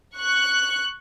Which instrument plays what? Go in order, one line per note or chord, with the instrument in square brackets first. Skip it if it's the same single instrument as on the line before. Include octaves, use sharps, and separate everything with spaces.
[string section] C#6 F#6